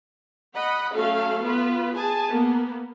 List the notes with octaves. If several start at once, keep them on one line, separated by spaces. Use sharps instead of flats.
D#5 F#5 B5
F#3 A3 C#4 F#4 A4 F5
B3 F4 B4
G#4 G#5 A5
A#3 B3